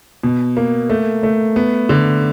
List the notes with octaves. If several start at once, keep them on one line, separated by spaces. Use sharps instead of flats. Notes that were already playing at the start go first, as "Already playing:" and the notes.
B2
A#3
A3
A3
B3
D3